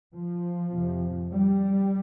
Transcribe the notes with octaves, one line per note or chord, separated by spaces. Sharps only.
F3
F2 C3
G3